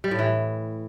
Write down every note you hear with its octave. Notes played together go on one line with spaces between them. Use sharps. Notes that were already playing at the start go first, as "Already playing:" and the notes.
G3
A2
E3